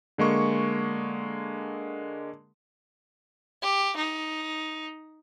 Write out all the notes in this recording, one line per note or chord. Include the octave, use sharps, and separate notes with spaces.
D3 G#3 A#3 C#6
G4
D#4